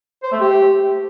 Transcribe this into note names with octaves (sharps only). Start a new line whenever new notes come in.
C5
A3
G4